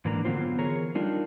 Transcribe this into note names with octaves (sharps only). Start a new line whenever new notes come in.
G#2 E3 A#3 D4 A#5
D3 F#3 B3 C4 F4 C5
E3 G#4 A#4 C#5 A#5
G3 D4 D#4 F4 A#4